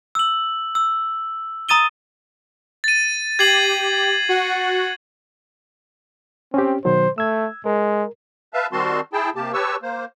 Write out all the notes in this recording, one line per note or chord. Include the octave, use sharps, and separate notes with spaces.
E6 F#7
E6
A#5 D#6 A6 D#7 G7
A6 D#7
G4 G#6 C7 F#7
F#4 F#5
C4 C#4 G4
B2 D#3 F#3 C5
A3 E6 G#6
G#3 A#4
B4 E5 F5 A5
D#3 G3 C4 F#4 A5 C6
E4 G#4 G5 A5
C3 A#3 G4 A5
G4 B4 C#5 A5 C#6 E6
A#3 C5